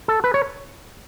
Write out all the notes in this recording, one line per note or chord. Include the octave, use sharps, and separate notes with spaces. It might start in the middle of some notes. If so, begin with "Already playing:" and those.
A4
B4
C#5